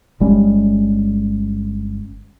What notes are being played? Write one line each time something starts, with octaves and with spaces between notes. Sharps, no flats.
G1 G3 G#3 C#4